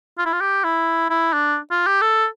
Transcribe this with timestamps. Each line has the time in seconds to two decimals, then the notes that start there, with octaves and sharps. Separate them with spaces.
0.18 F4
0.26 E4
0.33 F4
0.41 G4
0.64 E4
1.10 E4
1.33 D4
1.71 F4
1.87 G4
2.02 A4